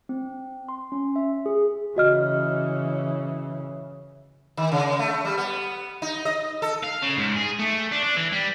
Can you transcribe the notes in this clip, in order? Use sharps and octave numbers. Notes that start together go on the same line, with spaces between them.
C4
C6
C#4
E5
G#4
C#3 E3 F#4 D#5 F6
D#3
C#3
A3
G3
B3
D#4
D#5
A4
F5
C#3
G#2
G#4
A3
D4
D4
E3
G3